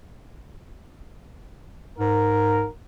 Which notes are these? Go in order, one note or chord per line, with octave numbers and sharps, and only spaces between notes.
G#2 A#4